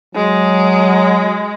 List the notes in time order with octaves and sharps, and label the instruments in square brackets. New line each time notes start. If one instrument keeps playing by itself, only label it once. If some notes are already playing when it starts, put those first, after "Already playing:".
[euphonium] F#3 [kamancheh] G#3